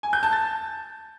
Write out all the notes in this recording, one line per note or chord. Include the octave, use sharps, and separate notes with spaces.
G#5
G6
A5
A6